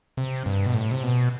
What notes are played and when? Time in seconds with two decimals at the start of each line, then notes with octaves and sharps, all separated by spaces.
0.17 C3
0.46 G2
0.66 B2
0.74 A2
0.91 C3
1.03 B2